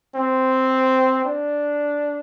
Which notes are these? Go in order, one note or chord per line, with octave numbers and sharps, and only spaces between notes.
C4
D4